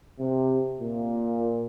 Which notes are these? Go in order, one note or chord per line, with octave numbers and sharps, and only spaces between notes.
C3
A#2